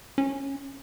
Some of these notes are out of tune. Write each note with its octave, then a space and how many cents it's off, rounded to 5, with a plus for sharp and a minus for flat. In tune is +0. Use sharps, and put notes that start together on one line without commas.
C#4 -10